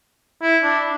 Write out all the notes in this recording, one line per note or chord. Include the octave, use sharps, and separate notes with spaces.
E4
D4